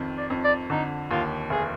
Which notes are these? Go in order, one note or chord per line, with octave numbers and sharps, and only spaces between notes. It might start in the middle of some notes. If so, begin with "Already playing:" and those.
Already playing: F2 D#3
D5
F2
D5
D3 D#4
D#2 F4
F1 G#4